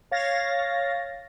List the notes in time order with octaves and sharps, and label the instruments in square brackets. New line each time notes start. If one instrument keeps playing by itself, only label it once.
[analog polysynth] C#5 F5 A6 A#6